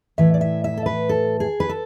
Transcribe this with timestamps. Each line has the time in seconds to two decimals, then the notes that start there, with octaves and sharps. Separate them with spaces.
0.18 A2 E3 E5
0.34 D5
0.41 E5
0.64 E5
0.77 A4
0.86 B4
1.09 A4
1.40 G#4
1.60 B4
1.69 A4